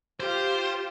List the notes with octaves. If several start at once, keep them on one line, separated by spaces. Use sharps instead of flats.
F4 G4 C5